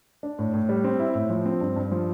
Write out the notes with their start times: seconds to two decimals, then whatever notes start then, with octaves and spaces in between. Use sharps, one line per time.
0.23 D4
0.39 A2
0.54 A2
0.69 G3
0.84 C4
1.00 E4
1.15 A2
1.30 F3
1.46 C4
1.61 G2
1.76 G2
1.91 F3